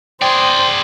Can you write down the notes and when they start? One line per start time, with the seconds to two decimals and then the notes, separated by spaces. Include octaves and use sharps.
0.22 G#4 C5 D5 G5